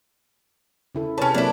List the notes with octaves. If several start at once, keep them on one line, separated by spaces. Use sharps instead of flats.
C#3 E4 A4
C3 C#4 B4 C#5 A5
F#3 A#3 C4 D4 E4